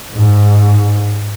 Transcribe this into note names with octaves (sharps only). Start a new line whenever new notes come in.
G#2